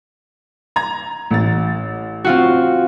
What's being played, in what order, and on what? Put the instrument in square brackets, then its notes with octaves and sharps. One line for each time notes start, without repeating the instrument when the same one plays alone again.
[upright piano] A#5 G#6
A1 A6
[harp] C4 F4 F#4